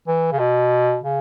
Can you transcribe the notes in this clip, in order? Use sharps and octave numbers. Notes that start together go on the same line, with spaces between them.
E3
C#3
B2
C#3